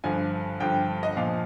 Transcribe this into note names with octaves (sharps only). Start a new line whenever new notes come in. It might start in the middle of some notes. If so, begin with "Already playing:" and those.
G2 D3 F3 G#5
G2 D3 F3 G5
D#5
A#2 F3 F5